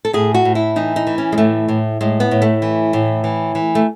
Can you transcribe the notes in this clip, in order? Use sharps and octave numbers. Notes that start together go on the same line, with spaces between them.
A4
A2 G#4
F#4
A2
E4
E3 D#4
D#4
E3
C#4
G#3
A2 A3
A2
A2 G#3
B3
A2
A3
E3
A2
E3
E3
A3